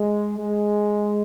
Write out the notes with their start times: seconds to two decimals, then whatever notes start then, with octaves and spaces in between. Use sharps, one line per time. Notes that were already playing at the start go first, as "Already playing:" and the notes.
Already playing: G#3
0.38 G#3